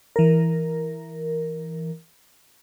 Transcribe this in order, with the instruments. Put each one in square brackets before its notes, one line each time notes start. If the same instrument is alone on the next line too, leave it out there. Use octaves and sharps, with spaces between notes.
[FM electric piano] E3 A#4